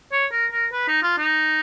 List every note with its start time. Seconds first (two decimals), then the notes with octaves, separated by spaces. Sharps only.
0.12 C#5
0.32 A#4
0.52 A#4
0.72 B4
0.88 D#4
1.02 F4
1.18 D#4